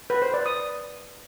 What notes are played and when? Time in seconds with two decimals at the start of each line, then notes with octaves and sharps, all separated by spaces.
0.10 B4
0.22 C5
0.34 D5
0.46 D#6